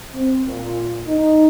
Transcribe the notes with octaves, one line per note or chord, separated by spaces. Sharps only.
C4
A#2
D#4